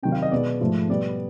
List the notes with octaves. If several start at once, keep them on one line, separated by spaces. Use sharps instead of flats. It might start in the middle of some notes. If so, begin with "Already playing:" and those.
C3 D#3 F#3 G5
F5
D#5
B2 G#3 B3 D5
G#2 F3 A3
B2 G3 B3 D5